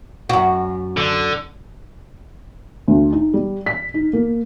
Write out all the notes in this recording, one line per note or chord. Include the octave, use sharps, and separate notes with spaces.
F#2 F#4
D3
D2
D#4
G3
B6
D#4
A#3